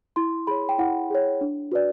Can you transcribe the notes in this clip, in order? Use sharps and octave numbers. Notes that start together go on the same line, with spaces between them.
E4 C6
G#4 C#5 B5
G5
E4 F#5
G#4 C#5
D4
F#4 B4 D5